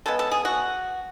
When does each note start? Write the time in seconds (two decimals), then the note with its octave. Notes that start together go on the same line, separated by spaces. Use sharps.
0.06 C#3 G#3 B3 A4
0.19 A4
0.31 G#4
0.45 F#4